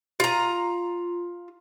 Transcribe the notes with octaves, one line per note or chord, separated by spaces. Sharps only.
F4 A#5